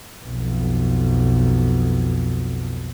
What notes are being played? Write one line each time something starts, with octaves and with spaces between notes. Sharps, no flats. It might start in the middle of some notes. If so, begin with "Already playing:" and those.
B1 F2